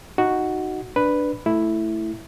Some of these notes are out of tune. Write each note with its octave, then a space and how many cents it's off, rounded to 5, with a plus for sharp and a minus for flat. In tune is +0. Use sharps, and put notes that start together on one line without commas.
D#4 +0 F#4 +0
D4 +5 B4 +0
A3 +0 E4 +0